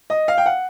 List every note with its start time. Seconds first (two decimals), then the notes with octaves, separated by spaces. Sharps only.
0.10 D#5
0.28 F5
0.38 G5
0.46 F#5